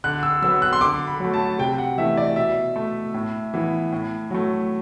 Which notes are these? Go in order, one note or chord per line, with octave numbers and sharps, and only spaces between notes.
D3 F#6
E6
F#3 B3 E6
F#6
C6
D3 D6
B5
F#3 A3
A5
C3 G5
F#5
E3 A3 E5
D5
B2 E5
A3
A2
E3 B3
A2
F#3 A3